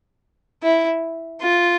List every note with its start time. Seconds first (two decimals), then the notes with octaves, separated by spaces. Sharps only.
0.63 E4
1.41 F4